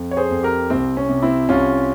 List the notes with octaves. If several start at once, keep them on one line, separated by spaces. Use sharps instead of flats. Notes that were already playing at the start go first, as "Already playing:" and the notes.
Already playing: F2
C#5
G#4 C5
F2
G4 A#4
C2 C4
C#4
C3
C4 E4
C2 C#4 F4